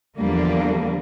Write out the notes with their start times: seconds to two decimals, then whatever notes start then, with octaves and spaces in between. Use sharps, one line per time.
0.18 E2 D3 F3 G3 A#3 D4